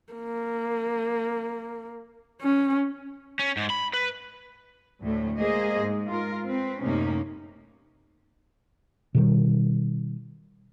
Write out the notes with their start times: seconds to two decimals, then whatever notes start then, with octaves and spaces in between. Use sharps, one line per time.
0.13 A#3
2.42 C#4
3.39 C#4
3.57 G#2
3.70 B5
3.93 B4
5.02 D2 A2 A3
5.40 G#3 A#3 G#4 C5 D#5
5.78 G#2
6.09 F4 A#4
6.46 C4 B4
6.82 F#2 A2 C3 A#3 C#4 D#4
9.15 B2 D#3 G3